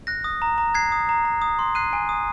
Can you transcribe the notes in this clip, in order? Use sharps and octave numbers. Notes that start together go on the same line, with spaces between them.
F#6 A#6
D#6
A#5
A#5
F#6 G#6 C7
D#6
A#5
A#5
D#6
C6
F#6 C7 D#7
G#5
D#6